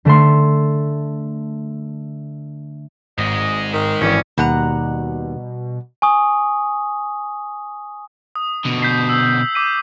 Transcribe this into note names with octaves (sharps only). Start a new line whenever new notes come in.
D3 A3 A4 C6
G#1 G#2 G#3 D#5
D#3
G#1 E3 C#4 D5
D#2 B2 G3 F#5 A#5
G#5 C#6 D#6
D#6
B2 D3
G6 B6 C7
E6
D6 B6 D#7